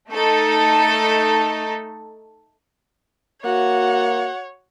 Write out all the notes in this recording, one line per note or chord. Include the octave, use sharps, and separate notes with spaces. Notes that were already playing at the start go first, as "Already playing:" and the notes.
A3 D#4 A4
A#3 F#4 C#5 F#5